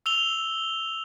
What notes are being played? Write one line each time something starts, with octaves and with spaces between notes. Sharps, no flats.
E6 F7 G7